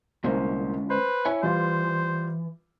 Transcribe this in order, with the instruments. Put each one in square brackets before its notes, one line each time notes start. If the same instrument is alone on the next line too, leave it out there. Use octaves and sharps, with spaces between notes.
[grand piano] C2 A#3 C5 [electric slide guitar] D3 G#3 C#4
[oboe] B4 [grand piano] C5
[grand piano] E4 [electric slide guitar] C#5 G#5
[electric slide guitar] E3 [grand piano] G3 F4 [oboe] C5